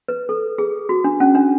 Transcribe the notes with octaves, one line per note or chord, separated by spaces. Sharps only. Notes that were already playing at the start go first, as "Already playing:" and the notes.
B4
A4
G#4
F#4
D4
C#4
D4